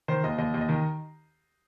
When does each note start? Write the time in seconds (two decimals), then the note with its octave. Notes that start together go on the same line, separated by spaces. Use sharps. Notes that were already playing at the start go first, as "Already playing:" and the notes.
0.08 D#3 C5
0.24 D#2 D#5
0.38 D#2 D#5
0.54 D#2
0.61 D#5
0.69 D#3